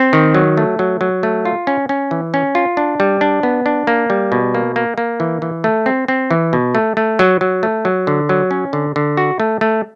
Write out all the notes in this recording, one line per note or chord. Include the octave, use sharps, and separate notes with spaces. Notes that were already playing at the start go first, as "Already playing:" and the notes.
Already playing: C4
D#3
F#3
A3
F#3
F#3
A3
F4
C#4
C#4
E3
C#4
F4
D4
G3
D4
B3
D4
A#3
G3
B2
A#3
A#3
A#3
E3
E3
A3
C4
C4
E3
B2
A3
A3
F#3
F#3
A3
F#3
D3
F#3
C#4
D3
D3
F#4
A3
A3